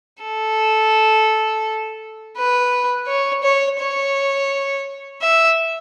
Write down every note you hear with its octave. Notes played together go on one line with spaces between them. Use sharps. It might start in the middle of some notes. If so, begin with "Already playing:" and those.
A4
B4
C#5
C#5
C#5
E5